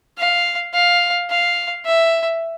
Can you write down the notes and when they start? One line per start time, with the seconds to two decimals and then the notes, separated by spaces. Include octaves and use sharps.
0.18 F5
0.73 F5
1.30 F5
1.85 E5